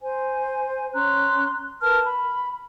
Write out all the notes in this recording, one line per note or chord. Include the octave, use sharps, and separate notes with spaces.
C5 G#5
C#4 A#5 C6 F#6
A#4 B4 A5 F6
B5